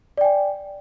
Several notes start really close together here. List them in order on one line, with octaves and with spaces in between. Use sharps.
D5 G5 G#5